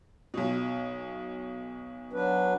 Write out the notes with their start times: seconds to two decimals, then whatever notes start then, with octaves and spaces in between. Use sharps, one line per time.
0.34 B1 B2
2.13 F#3 D4 B4